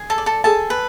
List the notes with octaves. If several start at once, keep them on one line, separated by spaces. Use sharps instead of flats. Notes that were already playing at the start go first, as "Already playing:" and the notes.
Already playing: G#4
A4 A5
D5
A4 A5
G#4 A4 A5
B4